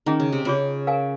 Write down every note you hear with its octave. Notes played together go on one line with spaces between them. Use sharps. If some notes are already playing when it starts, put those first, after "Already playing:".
D#3 C#4 G#4 D#5 A#5
C#3
C3
C#3 F4 G#4 C#5
A#4 F5 G#5